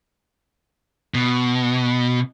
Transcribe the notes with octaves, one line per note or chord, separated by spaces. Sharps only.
B2